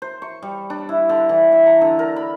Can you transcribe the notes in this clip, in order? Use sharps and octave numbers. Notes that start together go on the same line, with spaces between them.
C5
C#6
G3
D4
E4
D3
E3
E5
A#5
D3
A#4
B5